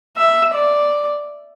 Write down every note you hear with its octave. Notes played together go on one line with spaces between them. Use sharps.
E5
D5